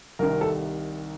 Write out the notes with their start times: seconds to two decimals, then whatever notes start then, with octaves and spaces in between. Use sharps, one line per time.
0.19 C2 C3 D#3 A#4
0.41 A4